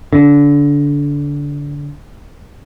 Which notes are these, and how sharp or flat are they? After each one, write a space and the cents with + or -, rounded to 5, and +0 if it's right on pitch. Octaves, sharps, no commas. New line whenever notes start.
D3 -25